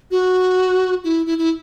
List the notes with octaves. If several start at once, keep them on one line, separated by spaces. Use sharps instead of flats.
F#4
E4
E4
E4